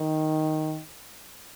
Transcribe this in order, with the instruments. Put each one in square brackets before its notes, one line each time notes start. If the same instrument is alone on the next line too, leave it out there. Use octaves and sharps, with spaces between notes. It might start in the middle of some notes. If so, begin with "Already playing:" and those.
Already playing: [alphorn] D#3